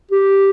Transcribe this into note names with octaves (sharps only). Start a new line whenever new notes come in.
G4